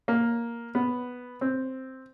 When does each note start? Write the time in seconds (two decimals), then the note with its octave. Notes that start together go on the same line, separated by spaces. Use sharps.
0.08 A#3
0.75 B3
1.41 C4